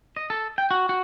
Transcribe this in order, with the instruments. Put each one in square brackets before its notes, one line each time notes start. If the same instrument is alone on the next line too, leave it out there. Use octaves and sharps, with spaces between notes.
[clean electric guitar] D#5
A4
G5
F#4
F#4